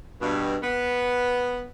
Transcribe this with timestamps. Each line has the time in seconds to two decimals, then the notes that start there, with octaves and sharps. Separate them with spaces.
0.21 G2 B2
0.63 B3